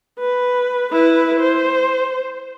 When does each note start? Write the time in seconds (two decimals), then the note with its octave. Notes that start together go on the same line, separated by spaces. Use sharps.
0.19 B4
0.92 E4 B4
1.41 C5